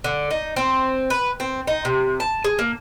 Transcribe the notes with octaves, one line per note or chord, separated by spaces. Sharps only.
D3
D#4
C4
B4
C4
D#4
C3
A5
G#4
A#3